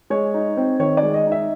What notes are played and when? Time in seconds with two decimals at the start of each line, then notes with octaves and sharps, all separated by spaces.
0.10 G#3 C#5
0.34 D#4
0.57 C4
0.79 D#3 C#5
0.97 D5
1.03 G#3
1.14 D#5
1.26 D#4
1.32 E5